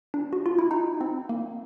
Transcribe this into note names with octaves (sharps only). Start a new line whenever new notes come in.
D4
F#4
F4
E4
D#4
C4
A#3